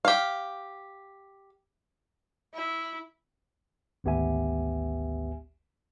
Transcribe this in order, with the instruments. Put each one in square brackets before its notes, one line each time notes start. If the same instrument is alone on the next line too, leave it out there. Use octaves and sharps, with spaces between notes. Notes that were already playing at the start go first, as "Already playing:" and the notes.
[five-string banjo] G4 F5
[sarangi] E4
[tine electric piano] G#1 D2 B3 G4 E5 G#5